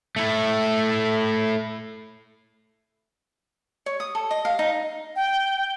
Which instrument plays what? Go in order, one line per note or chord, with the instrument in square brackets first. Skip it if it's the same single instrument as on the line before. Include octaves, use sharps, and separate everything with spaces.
[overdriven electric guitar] A3 E4
[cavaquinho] C#5
D#6
A4
D#5
F5
D#4
[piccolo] G5